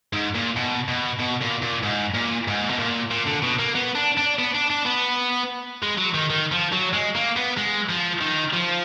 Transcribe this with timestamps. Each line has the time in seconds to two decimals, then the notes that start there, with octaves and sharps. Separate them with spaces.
0.13 G#2
0.35 A#2
0.56 B2
0.88 B2
1.19 B2
1.41 A#2
1.62 A#2
1.83 G#2
2.15 A#2
2.48 G#2
2.69 B2
2.79 A#2
3.11 A#2
3.27 D3
3.43 B2
3.59 A#3
3.75 B3
3.96 D4
4.17 D4
4.39 B3
4.55 D4
4.71 D4
4.86 B3
5.83 G#3
5.98 F#3
6.14 D#3
6.30 D#3
6.52 F3
6.72 F#3
6.93 G#3
7.15 A#3
7.37 B3
7.57 G#3
7.89 F3
8.21 D#3
8.53 F3